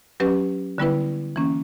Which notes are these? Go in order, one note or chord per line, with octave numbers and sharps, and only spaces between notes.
F#3 C#4 G4 B4
D3 G3 B3 E4 B4
E3 A#3 C#4